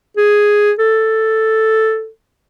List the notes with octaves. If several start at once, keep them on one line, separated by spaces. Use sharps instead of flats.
G#4
A4